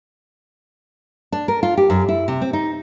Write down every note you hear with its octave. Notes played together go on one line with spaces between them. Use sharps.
D4
A#4
F4
G4
F#2
E4
C3
C4
D#4